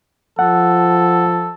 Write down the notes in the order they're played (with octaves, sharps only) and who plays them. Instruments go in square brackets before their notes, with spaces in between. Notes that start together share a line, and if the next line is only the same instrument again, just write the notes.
[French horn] F3 [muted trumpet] A4 [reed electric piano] F#5